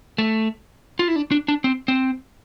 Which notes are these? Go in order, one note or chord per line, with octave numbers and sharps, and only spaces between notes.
A3
F4
E4
D4
D4
D4
C4
C4